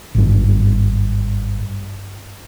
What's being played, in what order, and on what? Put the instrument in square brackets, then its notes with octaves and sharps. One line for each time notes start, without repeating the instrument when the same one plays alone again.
[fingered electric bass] G#1 G2